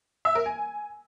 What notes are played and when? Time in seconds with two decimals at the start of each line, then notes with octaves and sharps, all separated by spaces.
0.25 E5
0.35 A#4
0.46 G#5